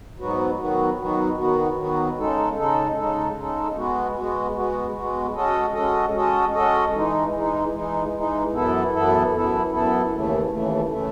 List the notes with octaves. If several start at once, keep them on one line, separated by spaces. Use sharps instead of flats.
G#2 F#3 B3 F#4
D#3 F#3 B3 F#4
D#3 F#3 B3 F#4
D#3 F#3 B3 F#4
D#3 F#3 B3 F#4
C#3 G#3 D#4 A4
C#3 G#3 D#4 A4
C#3 G#3 D#4 A4
C#3 G#3 D#4 A4
G#3 B3 F#4
G#3 B3 F#4
G#3 B3 F#4
G#3 B3 F#4
G#3 C#4 F#4 A4 D#5
G#3 C#4 F#4 A4 D#5
G#3 C#4 F#4 A4 D#5
G#3 C#4 F#4 A4 D#5
E3 G#3 D#4
E3 G#3 D#4
E3 G#3 D#4
E3 G#3 D#4
F#2 E3 B3 E4 A4
F#2 E3 B3 E4 A4
F#2 E3 B3 E4 A4
F#2 E3 B3 E4 A4
D#2 C#3 E3 A3
D#2 C#3 E3 A3
C#3 E3 A3